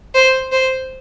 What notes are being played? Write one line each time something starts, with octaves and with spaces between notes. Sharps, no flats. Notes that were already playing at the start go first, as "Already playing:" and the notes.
C5
C5